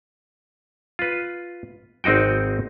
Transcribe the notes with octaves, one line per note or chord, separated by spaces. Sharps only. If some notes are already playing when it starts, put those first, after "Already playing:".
F4 B4
G#1 C4 D#4 F#4 G5